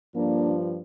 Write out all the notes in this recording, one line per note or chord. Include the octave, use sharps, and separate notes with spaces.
G2 F3 A#3 D4